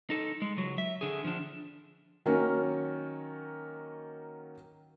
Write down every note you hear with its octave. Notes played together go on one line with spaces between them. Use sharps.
D#4 A4
G#3
C#2 F#3
E5
D3 G#4
F3 D4
D#3 F#3 A#3 C#4